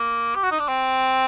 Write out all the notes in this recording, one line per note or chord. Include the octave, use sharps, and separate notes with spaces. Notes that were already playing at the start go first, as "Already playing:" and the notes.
Already playing: A#3
G4
F#4
D#4
D4
C4